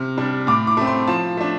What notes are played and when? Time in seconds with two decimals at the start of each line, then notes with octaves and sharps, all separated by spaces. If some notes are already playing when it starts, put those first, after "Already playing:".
Already playing: C3 F6
0.17 G3 D4
0.47 A2 D6
0.67 D6
0.77 A3 C4
0.87 C6
1.08 F3 A5
1.37 A3 D4